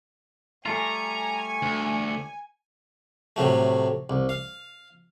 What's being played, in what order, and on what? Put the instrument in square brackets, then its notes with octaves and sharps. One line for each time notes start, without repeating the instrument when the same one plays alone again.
[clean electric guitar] G3 A3 F4 [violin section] G#5 [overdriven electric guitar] A#5 [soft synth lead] C#7
[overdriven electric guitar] D2
[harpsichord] A2 C3 F#3 A3
C2
F5